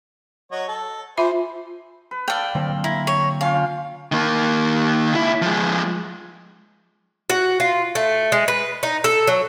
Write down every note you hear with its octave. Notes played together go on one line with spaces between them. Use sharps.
F#3 C#5 D#5
A4
F4 G#4 C5 E5 B5
B4
A4 D5 F5 G5 A5
D3 F#3 A#3 C4
E4 A#5
C#5
C#4 F4 F5 G5
D#3 A#3
C#2 E4
F3 G#3
F#4
F4
A3
G#3
B4
D#4
A4
F#3